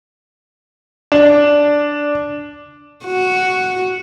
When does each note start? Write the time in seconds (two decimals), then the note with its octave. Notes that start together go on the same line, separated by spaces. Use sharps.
1.12 D4
3.06 F#4